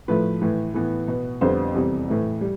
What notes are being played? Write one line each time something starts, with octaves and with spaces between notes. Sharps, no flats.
A2 F3 A3 B4
A2 E3 A3
A2 E3 B3
B2 B3
F2 D3 G3 B3 C5
E2 C3 G3
A2 E3 A3
G3